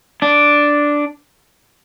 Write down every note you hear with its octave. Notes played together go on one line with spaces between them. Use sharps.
D4